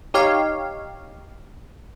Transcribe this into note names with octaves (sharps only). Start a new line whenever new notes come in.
D#4 G4 C#5 F5